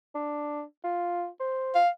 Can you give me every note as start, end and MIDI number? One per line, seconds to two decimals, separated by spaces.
0.15 0.62 62
0.84 1.28 65
1.40 1.76 72
1.75 1.89 77